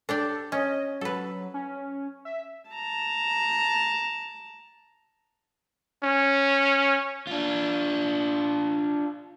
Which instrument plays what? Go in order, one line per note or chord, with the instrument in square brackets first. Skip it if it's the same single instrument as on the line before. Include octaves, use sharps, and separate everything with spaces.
[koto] D4 G4 D5 [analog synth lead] A4
[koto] C#4 [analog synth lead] D#5
[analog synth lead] F#3 [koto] A4 B4
[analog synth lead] C#4
E5
[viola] A5 A#5
[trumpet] C#4
[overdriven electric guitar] D4 F4